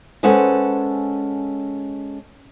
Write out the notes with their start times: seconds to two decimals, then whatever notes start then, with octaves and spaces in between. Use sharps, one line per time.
0.23 G#3 C#4 A4 B4 C5 F#5